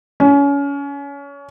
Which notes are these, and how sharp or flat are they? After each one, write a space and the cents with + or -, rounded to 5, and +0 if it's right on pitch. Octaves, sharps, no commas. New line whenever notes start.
C#4 +30